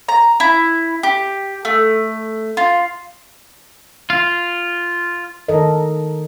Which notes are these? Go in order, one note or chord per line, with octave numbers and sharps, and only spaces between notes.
A#5
E4
G4
A3
F4
F4
D#3 D#4 A4 A#4 D#5